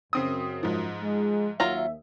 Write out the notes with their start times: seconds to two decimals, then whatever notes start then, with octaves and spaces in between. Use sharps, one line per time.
0.13 F#2 C#3 C4 D#6
0.63 G#2 F3
1.02 G#3
1.60 D#2 F#3 F4 E5 A#5